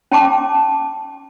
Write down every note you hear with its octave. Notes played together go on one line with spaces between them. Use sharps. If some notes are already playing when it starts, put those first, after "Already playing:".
C#4 G5 A5 D6